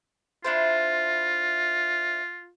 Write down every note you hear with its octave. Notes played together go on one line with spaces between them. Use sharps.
D4 E4 F4 C5